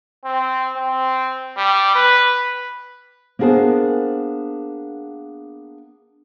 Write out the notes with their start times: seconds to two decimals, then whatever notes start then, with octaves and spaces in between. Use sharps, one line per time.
0.25 C4
0.77 C4
1.57 G3
1.95 B4
3.39 A#3 B3 D4 G#4 A#4 C5